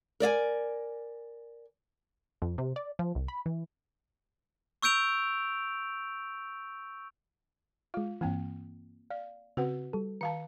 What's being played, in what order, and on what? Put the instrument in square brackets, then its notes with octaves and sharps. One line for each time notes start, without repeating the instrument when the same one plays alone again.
[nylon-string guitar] A#4 D5 E5 G#5
[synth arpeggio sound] F2
C3
D5
F3
C2
B5
E3
[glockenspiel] C#6 E6 G6 D7 F7
[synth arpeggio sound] G#3 F5 [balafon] F4
[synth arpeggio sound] G2 E3 [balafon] A#3 C4 G5
[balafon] D5 [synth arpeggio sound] F5
[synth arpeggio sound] C#3 C4 [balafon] F#4 B4 F#5
[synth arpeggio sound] G3 A4
[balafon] D#3 F5 A5 [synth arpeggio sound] C#7